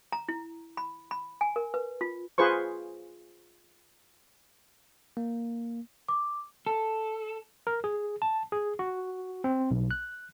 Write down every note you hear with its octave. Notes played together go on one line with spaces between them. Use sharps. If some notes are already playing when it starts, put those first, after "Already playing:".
A#5
E4
B5
B5
G#5
A#4
B4
F4
F4 G#4 B4 C5 C#6
A#3
D6
A4
A#4
G#4
A5
G#4
F#4
C4
B1
F#6